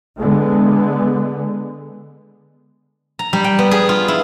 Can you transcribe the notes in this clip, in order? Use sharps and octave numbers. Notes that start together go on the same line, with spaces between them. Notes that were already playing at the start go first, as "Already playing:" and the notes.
D3 G#3 B3
A#5
G3
G5
B3
G#4
F4
E4